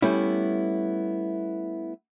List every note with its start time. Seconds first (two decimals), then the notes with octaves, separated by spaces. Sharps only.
0.02 G3 A3 B3 C#4 E4